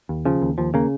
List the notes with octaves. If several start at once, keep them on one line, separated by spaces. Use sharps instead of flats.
D#2
C#3 F3
D#2
D#2 F3
C#3 A#3